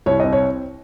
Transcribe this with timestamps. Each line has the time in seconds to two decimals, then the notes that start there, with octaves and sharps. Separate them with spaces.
0.06 C2 C#5
0.20 C4 D#5
0.33 C#5